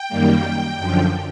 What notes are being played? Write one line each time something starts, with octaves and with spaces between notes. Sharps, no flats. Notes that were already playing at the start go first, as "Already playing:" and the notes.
Already playing: G5
F#2 D#3 G3 A#3
F#2 D3 F3